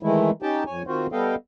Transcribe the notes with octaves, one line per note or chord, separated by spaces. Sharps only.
D#3 E3 G#3 A3 E4
C#4 D#4 G4 G5 A5
F2 C#5 G#5
D#3 C4 F4 F#4 C5
G3 B3 A4 D#5 F5 G5